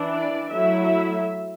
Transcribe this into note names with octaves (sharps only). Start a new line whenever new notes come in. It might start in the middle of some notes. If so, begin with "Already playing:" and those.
Already playing: E3 D4
D5
F#3 A3 E4 E5